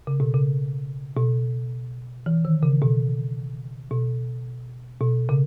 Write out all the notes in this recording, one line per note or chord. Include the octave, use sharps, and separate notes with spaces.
C#3
B2
C#3
B2
E3
D#3
C#3
B2
B2
B2
C#3